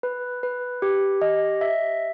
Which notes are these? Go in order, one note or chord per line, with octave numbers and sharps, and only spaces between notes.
B4
B4
G4
D#5
E5